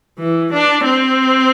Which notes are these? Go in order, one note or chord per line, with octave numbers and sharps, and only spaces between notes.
E3
D4
C4